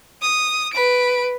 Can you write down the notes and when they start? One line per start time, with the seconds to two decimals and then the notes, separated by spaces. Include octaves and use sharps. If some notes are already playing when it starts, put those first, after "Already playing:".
0.22 D#6
0.73 B4 D7